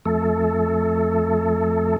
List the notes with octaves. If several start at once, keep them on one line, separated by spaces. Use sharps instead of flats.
F2 A3 A4